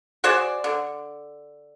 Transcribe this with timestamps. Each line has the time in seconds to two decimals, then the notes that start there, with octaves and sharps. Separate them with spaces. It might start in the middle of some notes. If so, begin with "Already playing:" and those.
0.24 F#4 G#4 C5 D5
0.64 D3